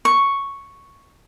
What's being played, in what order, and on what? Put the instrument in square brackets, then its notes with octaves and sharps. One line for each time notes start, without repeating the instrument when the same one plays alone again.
[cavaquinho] C#6